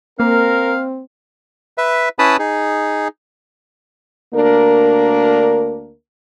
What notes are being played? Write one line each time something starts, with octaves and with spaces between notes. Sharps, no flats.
A#3 C4 A#4 F5
B4 E5
C#4 E4 B4 A5 B5 D#6
D#4 G#4
D2 A#3 D4 A#4